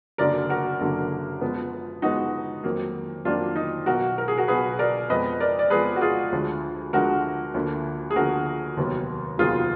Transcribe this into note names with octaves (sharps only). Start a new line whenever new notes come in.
F#1 F#2 D3 F#3 A#3 A#4 D5
F#4 A#4
F#1 F#2 D3 F#3 A#3
F#2 F3 G#3 B3
F#2 F3 G#3 B3 D#4 F#4
F2 D#3 F#3 A#3
F2 D#3 F#3 A#3 D4 F4
D#4
B1 B2 F#3 F#4 A#4
A#4
G#4
F#4 A#4
B1 B2 F#3 G#4 B4
A#4 D5
F2 F3 G#3 B3 B4 D#5
A#4 D5
D5
F2 F3 G#3 B3 G#4 B4
F#4
F4 G#4
D2 D3 F3 G#3
D2 D3 F3 G#3 F#4 A#4
D2 D3 F3 A#3
G#4
D2 D3 F3 A#3 F#4 A#4
F1 D#2 D#3 F#3 B3
F1 D#2 D#3 F#3 B3 F4 G#4